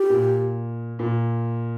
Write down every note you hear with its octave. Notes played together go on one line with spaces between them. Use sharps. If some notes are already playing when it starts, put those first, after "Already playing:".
Already playing: G4
A#2
A#2